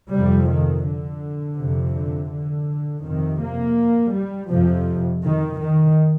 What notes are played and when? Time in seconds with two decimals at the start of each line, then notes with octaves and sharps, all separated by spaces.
0.11 F2 C3 G3
0.48 D#3
0.85 D3
1.58 F2 C3
1.93 D3
2.30 D3
3.03 F2 C3 D#3
3.40 A#3
4.12 G3
4.49 F2 C3 F3
5.23 D#3
5.59 D#3